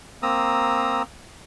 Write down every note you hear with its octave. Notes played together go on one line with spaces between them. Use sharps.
A#3 C4 A#5 D#6 E6